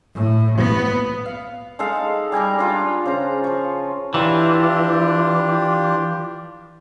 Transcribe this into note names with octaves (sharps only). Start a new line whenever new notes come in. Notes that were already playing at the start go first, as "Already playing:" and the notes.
A2
B3
F5
G#3 D#4 A4 F5
G3 G#5 A#5 D6
D4 F4
C#3 C5 A#5
F3 C#6
E3 D4 F4 G4